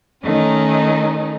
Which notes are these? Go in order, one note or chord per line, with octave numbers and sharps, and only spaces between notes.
D#3 A3 C#4 D#4